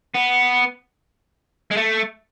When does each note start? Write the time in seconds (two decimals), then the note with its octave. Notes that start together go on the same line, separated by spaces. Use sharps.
0.14 B3
1.71 G#3
1.77 A3